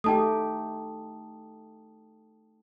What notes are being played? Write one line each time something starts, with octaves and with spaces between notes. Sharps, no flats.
A3 D#4 G4 G5 A5 D#6